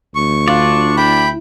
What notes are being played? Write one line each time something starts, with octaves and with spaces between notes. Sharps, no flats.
D2 C#6
D4 F4 D5
E4 G5 B5